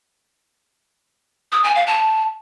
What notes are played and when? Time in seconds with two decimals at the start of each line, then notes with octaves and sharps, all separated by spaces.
1.52 D#6
1.64 G#5
1.75 F5
1.87 A5